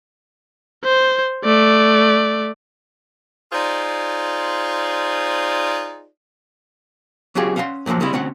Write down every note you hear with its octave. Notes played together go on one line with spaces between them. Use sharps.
C5
A3 D5
D#4 F4 G#4 C5 D5
F#3 C#4 F4 G4 G#4
C#4 F5 F#5 B5 C6
F#2 A#2 C#3 F3 F#3
C#3 G3 G#3 C4 E4
D2 C4 C#4 F#5